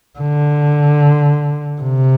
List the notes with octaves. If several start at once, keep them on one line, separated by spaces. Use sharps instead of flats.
D3
C3